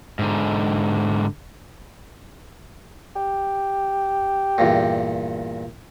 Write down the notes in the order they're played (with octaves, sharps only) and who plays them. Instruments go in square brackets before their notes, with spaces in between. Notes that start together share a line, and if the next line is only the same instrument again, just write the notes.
[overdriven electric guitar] G#2 D3
[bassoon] G4
[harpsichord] E2 G2 A#2